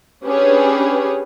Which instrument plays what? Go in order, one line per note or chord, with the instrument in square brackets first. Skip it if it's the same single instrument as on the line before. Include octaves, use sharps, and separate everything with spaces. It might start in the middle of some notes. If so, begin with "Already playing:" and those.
[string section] C#4 D4 G4 G#4 B4 C#5